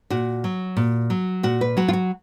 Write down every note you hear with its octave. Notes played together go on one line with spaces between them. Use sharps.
A#2 F#4
F#3
A#2
F#3
A#2 F#4
B4
F#3 F#4
F4
F#4